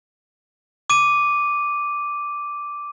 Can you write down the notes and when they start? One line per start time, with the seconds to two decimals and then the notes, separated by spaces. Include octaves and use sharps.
0.90 D6 D#7